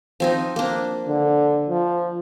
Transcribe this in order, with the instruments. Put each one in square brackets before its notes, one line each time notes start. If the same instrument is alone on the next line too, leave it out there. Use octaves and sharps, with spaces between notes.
[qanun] F3 C4 D#4
A#3 D4
[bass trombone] D3
F3